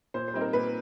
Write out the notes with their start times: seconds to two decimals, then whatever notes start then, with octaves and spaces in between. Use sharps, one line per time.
0.14 A#2 C5
0.28 C5
0.34 G3 C4 D#4
0.41 A#4
0.53 A#2 B4